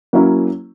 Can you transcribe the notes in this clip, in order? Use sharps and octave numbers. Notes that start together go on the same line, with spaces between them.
F#3 A#3 C#4 E4